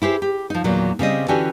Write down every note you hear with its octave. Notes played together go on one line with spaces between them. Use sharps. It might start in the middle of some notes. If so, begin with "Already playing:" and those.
E4 G4 G#4 C5
G4
F3 D#4
E2 A#2 D#3 F#3
C#3 G3 C4 D#5
D3 E3 C#4 F#4 G4 G#5